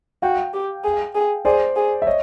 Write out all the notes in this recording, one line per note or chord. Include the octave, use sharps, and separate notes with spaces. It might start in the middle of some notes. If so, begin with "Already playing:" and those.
F#4 F5 G5
G4
G#4
G#4
G#4 C5 D5
G#4
E5
C#5 D#5